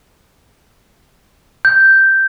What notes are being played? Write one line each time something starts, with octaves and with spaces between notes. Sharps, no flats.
G6